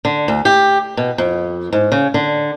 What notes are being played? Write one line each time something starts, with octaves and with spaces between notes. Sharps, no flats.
D3
D2
G4
B2
F2
G#2
C#3
D3